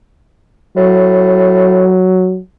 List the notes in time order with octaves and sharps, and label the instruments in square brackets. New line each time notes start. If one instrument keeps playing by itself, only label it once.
[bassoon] A2 [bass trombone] F#3